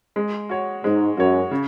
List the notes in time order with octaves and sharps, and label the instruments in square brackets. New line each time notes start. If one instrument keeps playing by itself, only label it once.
[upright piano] G#3
F#4 C#5
[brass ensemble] G#2 [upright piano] G#3
[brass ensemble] F#2 [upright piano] F#4 C#5
[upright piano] C#3